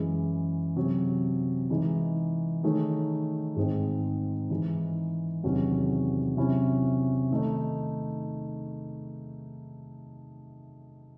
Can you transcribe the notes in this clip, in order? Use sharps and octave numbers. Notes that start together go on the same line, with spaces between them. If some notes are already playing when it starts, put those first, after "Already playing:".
Already playing: F#2 E3 G#3
C3 F#3 C#4
E3 G#3 D#4
D#3 A3 D#4 G#4 C#5
G#2 D#3 G#3 C4
E3 G#3 D#4
E2 C3 D#3 F#3 C#4
C3 F#3 C#4 E4
D#3 A3 D#4